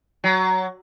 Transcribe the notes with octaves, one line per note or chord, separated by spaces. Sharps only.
F#3